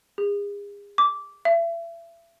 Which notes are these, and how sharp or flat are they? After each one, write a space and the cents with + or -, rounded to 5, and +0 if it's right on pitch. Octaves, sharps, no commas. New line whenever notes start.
G#4 -40
D6 -15
E5 +35